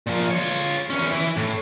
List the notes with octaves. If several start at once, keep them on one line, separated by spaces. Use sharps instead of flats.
A#2 F3
F4 C#5
E2 C#4
E3 E4
A2